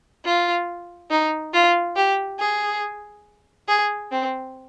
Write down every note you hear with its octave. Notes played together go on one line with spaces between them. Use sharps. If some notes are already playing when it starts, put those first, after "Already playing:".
F4
D#4
F4
G4
G#4
G#4
C4